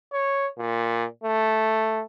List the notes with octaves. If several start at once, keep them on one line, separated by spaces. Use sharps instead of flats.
C#5
A#2
A3